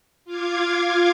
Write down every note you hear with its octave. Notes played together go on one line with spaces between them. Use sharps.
F4 F5 D6 G#6